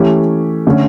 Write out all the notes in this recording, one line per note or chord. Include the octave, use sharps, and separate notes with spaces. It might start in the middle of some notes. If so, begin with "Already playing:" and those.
Already playing: E3 A3 C#4 G4
D3 A3 C#4